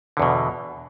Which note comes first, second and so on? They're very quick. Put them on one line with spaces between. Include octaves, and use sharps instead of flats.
D3 E2 B2